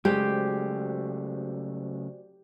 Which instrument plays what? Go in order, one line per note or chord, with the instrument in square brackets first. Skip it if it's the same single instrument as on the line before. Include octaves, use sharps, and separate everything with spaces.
[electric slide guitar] C#3 F#3 A3 [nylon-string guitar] G#3 [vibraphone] F#4 C5 D5 [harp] G4